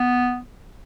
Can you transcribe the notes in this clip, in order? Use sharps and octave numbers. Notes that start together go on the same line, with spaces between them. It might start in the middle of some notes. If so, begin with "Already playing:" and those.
Already playing: B3